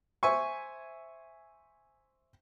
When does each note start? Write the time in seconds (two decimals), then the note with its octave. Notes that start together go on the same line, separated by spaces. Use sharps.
0.23 C5 E5 G#5 C#6